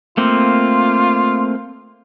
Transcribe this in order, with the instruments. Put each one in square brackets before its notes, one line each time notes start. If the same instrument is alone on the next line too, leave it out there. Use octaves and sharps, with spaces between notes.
[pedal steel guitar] A3 A#3 C4 [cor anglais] F4